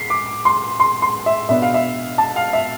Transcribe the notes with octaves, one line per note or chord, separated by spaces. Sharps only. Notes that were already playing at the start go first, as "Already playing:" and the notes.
Already playing: B6 C7
D6
C6
C6
C6
E5
B2 B3 D4 E5
F5
E5
A5
F5
E5